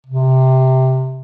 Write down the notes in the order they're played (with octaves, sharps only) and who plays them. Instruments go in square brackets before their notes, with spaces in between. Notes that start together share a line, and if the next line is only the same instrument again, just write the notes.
[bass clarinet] C3